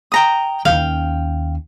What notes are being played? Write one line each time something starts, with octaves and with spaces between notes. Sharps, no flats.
G5 A#5 D#6
D#2 C#4 F5 G5